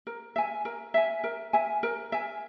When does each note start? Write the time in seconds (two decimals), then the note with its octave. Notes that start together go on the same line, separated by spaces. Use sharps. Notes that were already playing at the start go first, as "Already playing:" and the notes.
0.07 A#4
0.36 E5 G#5
0.65 A#4
0.94 E5 G#5
1.24 A#4
1.53 E5 G#5
1.83 A#4
2.12 E5 G#5